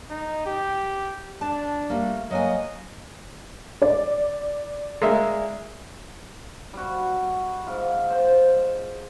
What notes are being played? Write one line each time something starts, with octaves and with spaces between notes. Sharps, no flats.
D#4
G4
D4 A5
G3 A3 A#3
F#3 A#3 D#5 G#5
D5
G#3 A#3 E5
G3 F#4
G#2 F4
C5